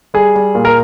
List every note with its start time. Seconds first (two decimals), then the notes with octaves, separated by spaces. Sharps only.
0.14 G3 G#4
0.35 G3
0.55 A#2
0.65 A#4